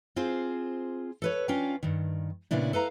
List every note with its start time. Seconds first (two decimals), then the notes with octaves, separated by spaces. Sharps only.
0.16 C4 F4 G#4 C5
1.22 A4 B4 C#5
1.48 C#4 D4 F4 F5 G5
1.83 G2 D#3
2.51 A#2 C#3 B3 D4 E4
2.73 A4 B4 F5 A#5